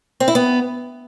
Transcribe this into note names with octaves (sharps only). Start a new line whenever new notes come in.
C4
E4
B3